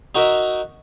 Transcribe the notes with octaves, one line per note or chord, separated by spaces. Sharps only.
D#4 F#4 A#4 D#5 E5